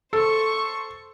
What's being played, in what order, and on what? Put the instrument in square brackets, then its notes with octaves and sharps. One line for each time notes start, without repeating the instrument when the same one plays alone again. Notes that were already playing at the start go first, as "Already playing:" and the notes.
[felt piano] A4 [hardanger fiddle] C5 C#6